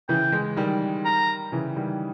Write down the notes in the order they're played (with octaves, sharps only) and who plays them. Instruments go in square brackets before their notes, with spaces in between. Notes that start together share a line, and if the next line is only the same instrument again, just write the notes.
[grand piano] C#3 E3 [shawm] G5
[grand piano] E3 G#3
D#3 G3
[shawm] A#5
[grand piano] C#3 E3
D#3 G3